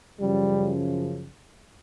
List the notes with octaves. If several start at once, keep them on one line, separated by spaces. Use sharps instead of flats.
F#2 C#3 F3 G3